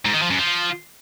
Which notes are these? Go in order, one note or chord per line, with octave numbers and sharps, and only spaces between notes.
G#2
D#3
F3
F#2
F3